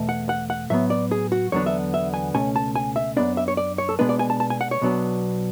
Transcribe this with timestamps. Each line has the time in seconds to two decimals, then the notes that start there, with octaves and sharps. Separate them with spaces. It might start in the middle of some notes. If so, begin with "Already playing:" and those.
Already playing: E2 B2 A3
0.09 F#5
0.29 F#5
0.50 F#5
0.70 A2 F#3 B3 E5
0.90 D5
1.11 G#4
1.32 F#4
1.52 E2 D3 F#3 B3 D4 C#5
1.66 E5
1.94 E5
2.14 G#5
2.34 C#2 B2 A3 C#4 G#5
2.56 A5
2.76 G#5
2.96 E5
3.17 F#2 E3 B3 D4 D5
3.37 E5
3.48 C#5
3.57 D5
3.78 C#5
3.89 A4
3.99 B2 G#3 B3 D4 B4
4.09 D5
4.19 G#5
4.30 A5
4.40 A5
4.50 G#5
4.61 F#5
4.71 C#5
4.81 B1 B2 F#3 B3 D4